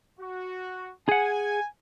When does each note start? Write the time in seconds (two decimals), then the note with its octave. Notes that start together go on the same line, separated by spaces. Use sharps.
0.20 F#4
1.09 G#4 F#5 G#5